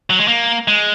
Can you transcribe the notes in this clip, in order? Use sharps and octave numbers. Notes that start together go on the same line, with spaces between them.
F#3
G#3
A#3
G#3